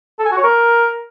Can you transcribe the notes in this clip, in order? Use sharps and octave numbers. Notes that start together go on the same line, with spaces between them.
A4
G#5
F#4
C#5
A#4